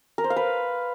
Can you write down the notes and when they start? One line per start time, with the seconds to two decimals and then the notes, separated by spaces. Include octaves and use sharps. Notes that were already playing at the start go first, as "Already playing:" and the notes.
0.18 A#4
0.24 C5
0.30 F5
0.36 B4